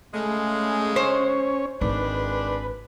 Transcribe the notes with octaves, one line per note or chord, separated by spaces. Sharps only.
C#3 G#3 A3
C#4 C5 C#5
G#1 D#3 G#3 D4 B4